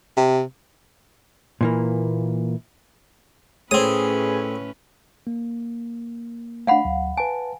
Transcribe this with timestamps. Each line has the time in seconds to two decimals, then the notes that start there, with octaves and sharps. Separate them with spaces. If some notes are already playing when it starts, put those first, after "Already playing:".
0.17 C3
1.61 A#2 E3 A#3
3.71 A2 A3 C4 C#4 G#4 B4 C#5 D#6
5.27 A#3
6.67 A3 D4 F5 F#5 B5
6.85 D2 F#3
7.17 B4 G#5 A5